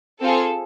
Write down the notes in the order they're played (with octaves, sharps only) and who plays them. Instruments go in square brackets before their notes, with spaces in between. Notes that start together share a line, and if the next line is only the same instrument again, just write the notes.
[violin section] C4 F4 G#4 A4